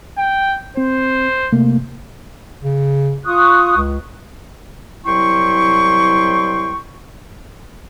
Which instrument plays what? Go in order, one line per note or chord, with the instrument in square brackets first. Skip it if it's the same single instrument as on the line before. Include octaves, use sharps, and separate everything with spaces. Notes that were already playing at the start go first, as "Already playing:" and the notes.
[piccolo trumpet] G5
[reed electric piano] C4 [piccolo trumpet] C5
[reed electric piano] C3 A3 A#3
[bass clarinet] C#3
[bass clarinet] F4 [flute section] C#6 D#6 F#6
[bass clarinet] C#2
[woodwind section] C2 F#3 E4 G5 C6 C#6